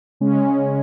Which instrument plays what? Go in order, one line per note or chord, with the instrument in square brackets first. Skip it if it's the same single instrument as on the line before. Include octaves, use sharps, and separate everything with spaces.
[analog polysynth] C#3 G#3 C#4